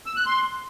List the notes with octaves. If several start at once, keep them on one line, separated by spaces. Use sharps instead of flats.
E6
F#6
C6